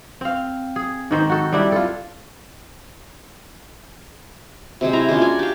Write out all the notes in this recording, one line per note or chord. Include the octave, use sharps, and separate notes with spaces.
C4 F5
G#4
G#2 D#3 C5
F#4 A4
G3 C4 D4 E4
F4 A4
C3 F#3 G#3
E4 F#4 E5 A#5
G#3 C#4 D4 F4
F#4 D5 G#5
G4 F5